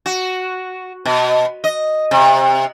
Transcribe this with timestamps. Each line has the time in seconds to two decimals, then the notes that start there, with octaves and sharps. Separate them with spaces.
0.06 F#4
1.06 B2
1.64 D#5
2.11 C3